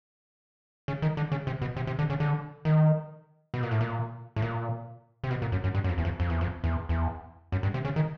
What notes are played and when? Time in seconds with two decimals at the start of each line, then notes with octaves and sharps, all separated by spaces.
0.88 C#3
1.02 D#3
1.17 D3
1.32 C#3
1.47 C3
1.62 B2
1.76 C3
1.87 C3
1.99 D3
2.10 C#3
2.20 D3
2.65 D#3
3.54 B2
3.63 A#2
3.71 A2
3.81 A#2
4.36 A2
4.42 A#2
5.24 C3
5.31 B2
5.42 A#2
5.52 F#2
5.64 F#2
5.75 G2
5.84 F#2
5.89 F2
5.98 E2
6.05 F2
6.20 F2
6.30 E2
6.41 F2
6.64 E2
6.89 E2
7.52 F#2
7.63 G2
7.74 C3
7.85 C#3
7.96 D#3